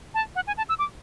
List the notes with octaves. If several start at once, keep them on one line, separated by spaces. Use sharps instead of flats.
A5
F#5
G#5
A5
E6
D6